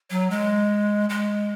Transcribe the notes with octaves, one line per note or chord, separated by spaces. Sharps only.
F#3
G#3
G#3